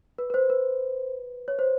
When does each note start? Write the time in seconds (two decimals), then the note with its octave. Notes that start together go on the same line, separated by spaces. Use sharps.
0.18 B4
0.30 B4
0.34 C5
0.50 B4
1.48 C#5
1.59 C5